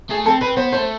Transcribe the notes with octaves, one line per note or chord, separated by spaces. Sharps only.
A3 G#4
C4 A4
C4 B4
B3 C5
A3 C5